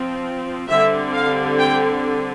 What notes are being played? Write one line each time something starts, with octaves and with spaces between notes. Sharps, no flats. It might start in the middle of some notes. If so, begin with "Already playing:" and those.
Already playing: F3 C4
D3 G3 C4 E5
F5
G5